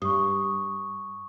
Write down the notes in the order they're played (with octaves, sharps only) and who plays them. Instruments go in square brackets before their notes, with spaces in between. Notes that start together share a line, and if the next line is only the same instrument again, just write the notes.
[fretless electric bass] G2 [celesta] C#6 D#6